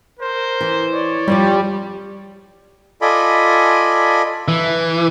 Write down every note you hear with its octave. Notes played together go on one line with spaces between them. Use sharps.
A#4 C5
E3
C#5 D5
F2 E3 F3 G3
F4 A4 D5 D#5 G#5 B5
E3